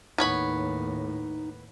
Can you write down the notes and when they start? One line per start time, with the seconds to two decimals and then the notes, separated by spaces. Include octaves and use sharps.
0.18 D#2 A2 B3 D#4 C#5 B5